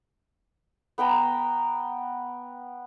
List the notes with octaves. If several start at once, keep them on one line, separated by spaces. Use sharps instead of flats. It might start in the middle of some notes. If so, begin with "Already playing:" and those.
B3 B4 G5 A#5